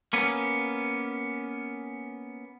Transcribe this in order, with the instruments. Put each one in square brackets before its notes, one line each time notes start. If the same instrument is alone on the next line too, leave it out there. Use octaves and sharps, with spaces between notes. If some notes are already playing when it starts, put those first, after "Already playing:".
[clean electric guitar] A#3 B3 C#4